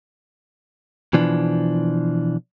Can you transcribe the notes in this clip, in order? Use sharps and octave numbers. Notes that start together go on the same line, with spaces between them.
B2 E3 F3 D4